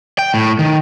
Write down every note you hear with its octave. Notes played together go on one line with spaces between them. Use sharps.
G5
A2
D#3